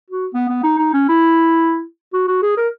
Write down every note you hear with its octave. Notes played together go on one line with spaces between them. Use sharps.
F#4
B3
B3
D#4
D#4
C#4
E4
F#4
F#4
G#4
A#4